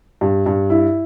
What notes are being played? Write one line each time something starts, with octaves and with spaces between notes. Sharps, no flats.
G2
G2
E4